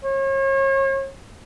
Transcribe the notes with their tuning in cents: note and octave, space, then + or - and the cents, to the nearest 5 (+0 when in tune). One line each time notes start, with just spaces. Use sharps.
C#5 -40